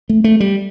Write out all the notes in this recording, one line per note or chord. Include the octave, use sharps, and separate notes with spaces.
A3
A3
G3